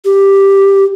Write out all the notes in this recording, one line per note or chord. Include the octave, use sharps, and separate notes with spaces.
G4